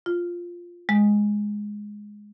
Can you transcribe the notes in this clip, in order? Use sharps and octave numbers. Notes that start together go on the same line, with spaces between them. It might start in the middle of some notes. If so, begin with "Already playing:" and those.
F4
G#3